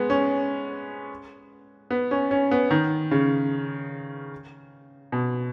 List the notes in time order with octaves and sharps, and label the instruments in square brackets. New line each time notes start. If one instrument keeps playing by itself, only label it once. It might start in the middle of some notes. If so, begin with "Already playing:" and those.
Already playing: [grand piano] G#3 B3
C#4
B3
C#4
C#4
B3
D#3
C#3
B2